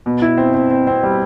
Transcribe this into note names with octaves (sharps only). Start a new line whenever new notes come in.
B2
E4
C4
C4
C4
C4
G3